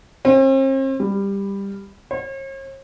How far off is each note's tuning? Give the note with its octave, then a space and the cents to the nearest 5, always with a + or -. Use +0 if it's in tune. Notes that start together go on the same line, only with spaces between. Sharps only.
C4 +45
G3 +15
C#5 -45